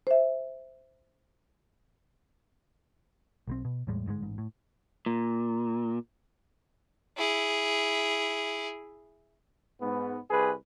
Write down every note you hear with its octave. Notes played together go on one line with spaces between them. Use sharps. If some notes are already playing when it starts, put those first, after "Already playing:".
C5 E5
B1 G3 C4
B2
E2 A2 G3 G#3
G1 G#2 C3 G#3
A1 G#2
A2
A#2
E4 G#4
G#2 B3
C2 G#4 B4